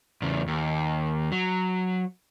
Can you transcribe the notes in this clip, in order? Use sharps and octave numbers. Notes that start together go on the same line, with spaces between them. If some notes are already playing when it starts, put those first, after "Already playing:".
E2 C#3
D#2
F#3